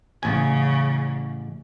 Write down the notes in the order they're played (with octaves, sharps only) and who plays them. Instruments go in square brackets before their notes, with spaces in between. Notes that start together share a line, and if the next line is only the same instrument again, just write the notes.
[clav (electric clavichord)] A1 G#5 [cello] C#3